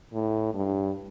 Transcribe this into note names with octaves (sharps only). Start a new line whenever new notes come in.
A2
G2